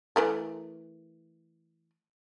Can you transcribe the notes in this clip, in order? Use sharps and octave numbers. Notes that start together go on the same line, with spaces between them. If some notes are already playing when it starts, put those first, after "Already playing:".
E3 A3 A#4